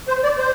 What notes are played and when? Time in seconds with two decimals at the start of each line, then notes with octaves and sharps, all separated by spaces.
0.08 C5
0.24 D5
0.38 C5